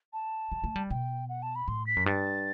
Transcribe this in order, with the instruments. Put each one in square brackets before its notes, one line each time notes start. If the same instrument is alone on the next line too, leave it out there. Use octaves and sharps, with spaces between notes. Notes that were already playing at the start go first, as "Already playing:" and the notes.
[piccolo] A5
[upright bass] G3
A3
G3
[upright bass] B2 [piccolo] G5
[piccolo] F#5
A5
B5
[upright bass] A2 [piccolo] C6
[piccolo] B6
[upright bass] F#2
[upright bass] G2 [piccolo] A6